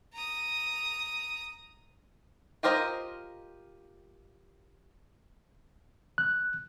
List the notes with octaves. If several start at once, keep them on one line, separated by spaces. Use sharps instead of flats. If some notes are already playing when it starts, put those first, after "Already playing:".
A#5 D#6
F4 G4 A#4 C5 D#5
F#6